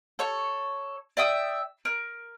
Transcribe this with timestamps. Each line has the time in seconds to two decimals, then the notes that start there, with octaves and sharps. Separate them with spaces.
0.19 A4 C#5 C#6
1.17 D5 E5 G5 D#6
1.85 A#4